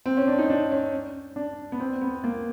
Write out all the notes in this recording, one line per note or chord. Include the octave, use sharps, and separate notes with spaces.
C4
C#4
D4
D#4
D4
C#4
D4
B3
C4
B3
A#3